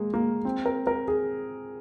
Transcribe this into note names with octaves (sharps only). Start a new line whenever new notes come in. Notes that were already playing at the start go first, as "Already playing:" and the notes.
Already playing: G#3 A#3
A#3
C4
A#4
A#4
G#4